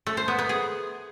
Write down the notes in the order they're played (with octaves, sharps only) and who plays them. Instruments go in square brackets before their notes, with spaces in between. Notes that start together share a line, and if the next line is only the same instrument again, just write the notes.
[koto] A3
C5
B3
B3
G#4